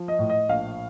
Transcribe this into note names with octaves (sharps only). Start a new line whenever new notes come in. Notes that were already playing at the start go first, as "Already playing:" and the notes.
Already playing: F3
D#5
A2
D#5
A#1 F5